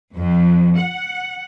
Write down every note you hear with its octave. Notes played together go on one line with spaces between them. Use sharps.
F2
F#5